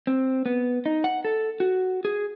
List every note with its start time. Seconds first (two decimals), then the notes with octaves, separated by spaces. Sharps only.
0.07 C4
0.46 B3
0.86 D#4
1.04 F#5
1.25 A4
1.60 F#4
2.05 G#4